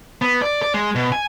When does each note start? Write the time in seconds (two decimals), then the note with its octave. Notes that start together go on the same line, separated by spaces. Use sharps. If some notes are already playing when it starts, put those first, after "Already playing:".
0.22 B3
0.42 D5
0.62 D5
0.74 G#3
0.95 B2
1.12 G#5